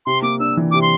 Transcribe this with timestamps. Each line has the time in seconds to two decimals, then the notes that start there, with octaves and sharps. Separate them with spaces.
0.06 C3 C6
0.22 A#3 D6
0.40 D4 E6
0.57 E3
0.71 C3 D6
0.82 C6